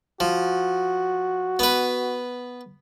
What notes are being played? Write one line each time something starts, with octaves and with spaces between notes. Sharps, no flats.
F3 F#4
B3 B4